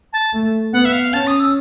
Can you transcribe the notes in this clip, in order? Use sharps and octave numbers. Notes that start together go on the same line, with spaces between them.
A5
A3
B3 F#5
E5
F5
C#4 A5
D#6
E6